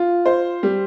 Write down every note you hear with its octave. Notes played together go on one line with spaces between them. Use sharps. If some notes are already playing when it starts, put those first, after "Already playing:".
Already playing: F4
C5
G3